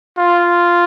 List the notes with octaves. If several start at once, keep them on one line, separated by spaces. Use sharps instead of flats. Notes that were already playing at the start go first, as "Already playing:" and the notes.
F4